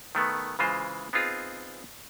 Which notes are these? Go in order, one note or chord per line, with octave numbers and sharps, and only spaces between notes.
D#3 A3 B3
C#3 E3 G#3 F4 C5
B3 C4 D#4 F4 G#4